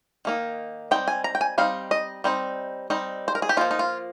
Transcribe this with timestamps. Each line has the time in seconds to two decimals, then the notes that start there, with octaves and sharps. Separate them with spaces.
0.25 D#3 A#3 D#4
0.91 G3 C4 D#4 G5
1.08 G#5
1.24 A#5
1.35 G5
1.41 G#5
1.58 G3 C4 D#4 F5
1.91 D#5
2.24 G3 C4 D#4
2.90 G3 C4 D#4
3.28 C5
3.35 A#4
3.42 G#4
3.49 G4
3.57 F3 A#3 D#4 F4
3.71 D#4
3.79 F4